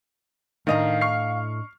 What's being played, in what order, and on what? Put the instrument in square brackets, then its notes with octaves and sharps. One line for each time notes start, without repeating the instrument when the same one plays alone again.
[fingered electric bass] A2 A3 [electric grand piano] D#3 [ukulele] D4 D#5 A#5 [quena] F5
[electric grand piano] C#6 F6 C7